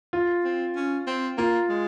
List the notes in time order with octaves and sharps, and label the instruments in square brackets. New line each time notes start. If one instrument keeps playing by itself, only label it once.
[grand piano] F4
[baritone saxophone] C4
C#4
C4
[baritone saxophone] A#3 [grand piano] F4
[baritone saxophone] G#3